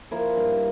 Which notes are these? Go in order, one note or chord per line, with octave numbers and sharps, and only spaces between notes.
F3 A#3 E4
G2